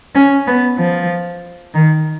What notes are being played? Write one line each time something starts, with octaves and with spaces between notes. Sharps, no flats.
C#4
B3
F3
D#3